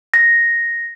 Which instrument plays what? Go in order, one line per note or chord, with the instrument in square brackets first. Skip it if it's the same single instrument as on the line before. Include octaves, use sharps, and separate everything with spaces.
[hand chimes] A#6